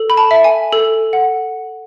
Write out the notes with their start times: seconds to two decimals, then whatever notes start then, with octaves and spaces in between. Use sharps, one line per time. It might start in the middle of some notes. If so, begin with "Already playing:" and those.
Already playing: A4
0.10 B5
0.17 A5
0.31 E5
0.44 G#5
0.73 A4
1.13 F#5